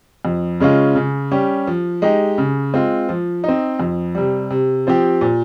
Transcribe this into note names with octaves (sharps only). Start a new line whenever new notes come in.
F2
C#3 G#3 C#4 F4
C#3
G3 C#4 G4
F3
G#3 D#4 G4
C#3
G#3 C4 F4
F3
C4 D#4
F2
C3 G3
C3
F3 C4 G4
A#2